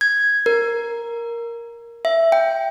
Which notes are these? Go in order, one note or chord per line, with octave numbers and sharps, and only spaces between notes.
G#6
A#4
E5
G5